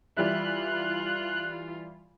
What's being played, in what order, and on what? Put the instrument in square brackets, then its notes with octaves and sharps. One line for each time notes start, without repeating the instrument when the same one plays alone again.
[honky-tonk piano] E3 G3 E5 [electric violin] F4 [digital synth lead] F#6